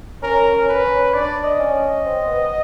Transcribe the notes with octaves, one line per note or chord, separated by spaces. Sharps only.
C#4 A#4
C#4
B4
C#4
D4 D5
D#5
C#4
D#5
C4
B3